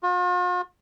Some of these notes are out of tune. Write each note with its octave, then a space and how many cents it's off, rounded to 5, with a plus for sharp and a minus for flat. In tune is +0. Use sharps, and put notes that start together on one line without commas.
F4 +45